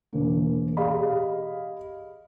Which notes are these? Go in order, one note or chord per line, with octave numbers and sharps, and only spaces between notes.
E1 A#3
G4 G#4 D#5 F5 B5